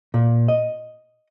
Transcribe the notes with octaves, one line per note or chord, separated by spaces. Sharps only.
A#2
D#5